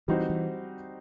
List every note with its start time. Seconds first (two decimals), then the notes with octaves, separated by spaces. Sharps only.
0.08 E3 G3 C4 D#4 F#4 C5
0.30 E3